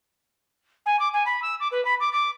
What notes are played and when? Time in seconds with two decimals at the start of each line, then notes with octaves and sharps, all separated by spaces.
0.86 G#5
0.99 D6
1.13 G#5
1.26 B5
1.42 E6
1.60 D6
1.72 B4
1.85 B5
2.00 D6
2.12 D6